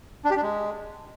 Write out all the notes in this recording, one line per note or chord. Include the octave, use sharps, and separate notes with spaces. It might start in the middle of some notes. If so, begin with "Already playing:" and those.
D4
G4
D4
G#3